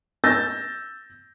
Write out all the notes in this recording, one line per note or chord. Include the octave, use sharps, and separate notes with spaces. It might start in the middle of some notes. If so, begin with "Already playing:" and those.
E6 G6 A6 A#6